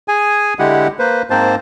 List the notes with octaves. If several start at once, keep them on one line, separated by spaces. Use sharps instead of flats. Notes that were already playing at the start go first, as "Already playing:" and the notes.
G#4 G#5
D3 G#3 E4 G4 F#5
A#3 B4 C5
G#2 A#3 C4 C5 A5